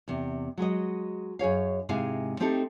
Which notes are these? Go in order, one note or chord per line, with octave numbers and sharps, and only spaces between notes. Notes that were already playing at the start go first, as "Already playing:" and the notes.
E2 C3
F#3 G#3 F#4 D#5
F#2 G#4 C#5 F5
G#2 C3 G#3 E4 F5 G#5
A3 C4 D#4 G4 A4